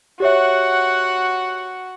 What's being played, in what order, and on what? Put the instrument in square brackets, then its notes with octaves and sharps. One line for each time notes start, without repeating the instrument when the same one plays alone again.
[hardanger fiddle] F#4 F#5 [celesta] G4 C#5 E5